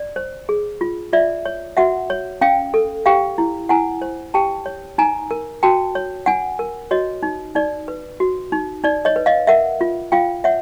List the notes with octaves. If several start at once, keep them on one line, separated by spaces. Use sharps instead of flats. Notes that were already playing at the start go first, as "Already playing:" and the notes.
Already playing: D5
C5
G#4
F4
F4 D5 E5
C#5
F#4 E5 F#5
C#5
C#4 F5 G5
A4
G4 F5 G5
E4
E4 F#5 G#5
C5
G4 G5 A5
C#5
D#4 G#5 A#5
A#4
F#4 G5 A5
C#5
D4 F#5 G#5
A#4
F#4 C#5 D#5
D#4
D#4 D5
B4
F#4
D#4
D#4 D5
C#5 D#5
B4
D#5 F5
A#4 E5 F#5
F4
F4 F5 G5
C#5 E5 F#5